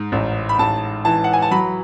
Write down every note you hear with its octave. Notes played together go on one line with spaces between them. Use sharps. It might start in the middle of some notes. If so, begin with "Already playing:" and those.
Already playing: G#2
A1
B5
A1 A5
E3 A5
F#5
G#5
A5
F#3 B5